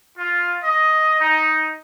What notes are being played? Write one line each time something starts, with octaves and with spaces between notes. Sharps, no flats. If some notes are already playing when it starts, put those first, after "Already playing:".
F4
D#5
D#4